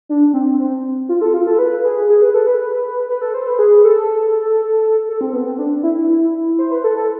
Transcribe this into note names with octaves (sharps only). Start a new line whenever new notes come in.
D4
C4
C4
F4
A4
F4
A4
B4
G#4
G#4
B4
A4
B4
B4
A4
C5
B4
G#4
A4
A4
C4
B3
C4
D4
E4
E4
C5
B4
A4
A4